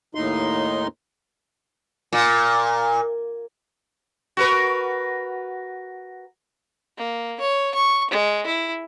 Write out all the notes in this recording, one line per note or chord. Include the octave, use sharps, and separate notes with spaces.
D#2 A2 D#4 C6
A#2
F#4 A#4 B4
A#3
C#5
C#6
G#3
E4